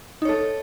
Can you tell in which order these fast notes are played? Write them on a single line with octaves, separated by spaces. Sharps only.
D#4 C#5 A4